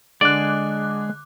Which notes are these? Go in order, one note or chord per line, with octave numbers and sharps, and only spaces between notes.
D3 G#3 G#4 D5 D6 F#6